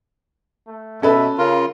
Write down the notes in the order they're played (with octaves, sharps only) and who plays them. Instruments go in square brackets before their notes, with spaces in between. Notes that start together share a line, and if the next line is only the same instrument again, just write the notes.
[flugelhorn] A3
[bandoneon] B2 [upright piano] C#4 A4 B4 [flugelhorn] E5
[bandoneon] C#3 F4 [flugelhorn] A#4